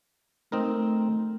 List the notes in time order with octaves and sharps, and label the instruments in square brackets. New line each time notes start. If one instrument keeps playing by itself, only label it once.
[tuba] A3 [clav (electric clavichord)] C4 D#4 A#4